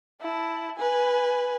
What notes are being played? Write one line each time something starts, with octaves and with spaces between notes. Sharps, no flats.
E4 A5
B4 G#5